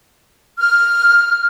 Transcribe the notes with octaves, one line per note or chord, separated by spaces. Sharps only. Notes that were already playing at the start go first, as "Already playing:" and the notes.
F6